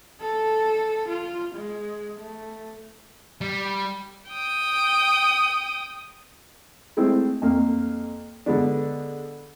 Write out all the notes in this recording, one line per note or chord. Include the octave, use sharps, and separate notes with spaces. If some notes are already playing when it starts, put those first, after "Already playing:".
A4
F4
G#3
A3
G3
G5 D#6
G#3 A3 C4 E4
F2 A#3
D3 G#3 B3 D4